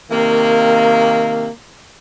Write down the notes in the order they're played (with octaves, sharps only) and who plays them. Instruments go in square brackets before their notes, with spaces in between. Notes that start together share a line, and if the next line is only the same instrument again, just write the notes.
[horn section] C3 D#3 A#3